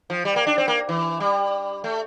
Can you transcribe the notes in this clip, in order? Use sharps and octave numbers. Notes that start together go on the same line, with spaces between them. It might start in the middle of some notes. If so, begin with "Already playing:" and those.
F3
G3
A#3
D4
C4
A#3
E3
G3
A3